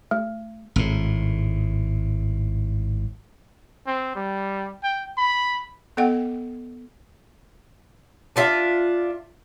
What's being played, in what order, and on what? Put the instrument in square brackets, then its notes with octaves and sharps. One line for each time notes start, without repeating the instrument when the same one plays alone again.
[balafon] A3
[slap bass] G#1 A2
[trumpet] C4
G3
G5
B5
[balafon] B3 A4 D#5 F#5 G5
[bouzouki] D4 F4 E5